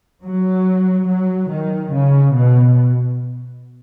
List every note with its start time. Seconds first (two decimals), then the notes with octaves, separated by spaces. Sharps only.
0.23 F#3
1.08 F#3
1.50 D#3
1.92 C#3
2.34 B2